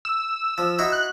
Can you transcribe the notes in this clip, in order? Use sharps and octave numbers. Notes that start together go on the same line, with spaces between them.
E6
F3
D#4 E4 F#4
F#6